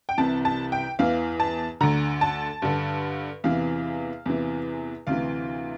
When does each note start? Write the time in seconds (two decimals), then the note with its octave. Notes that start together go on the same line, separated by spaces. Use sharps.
0.09 G5
0.18 C2 C3 E3 A5
0.45 A5
0.72 G5
0.99 E2 E3 F5
1.40 A5
1.81 D2 D3 A#5
2.21 A5
2.62 G2 D3
3.44 E2 C3 E3 F5
4.26 E2 C3 E3
5.07 D2 C3 E3 F5